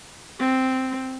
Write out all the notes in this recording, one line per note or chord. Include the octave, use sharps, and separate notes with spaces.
C4